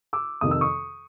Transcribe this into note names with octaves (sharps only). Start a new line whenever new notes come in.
D6 E6
F2 C3 D#3 D#6
E6
C#6 D#6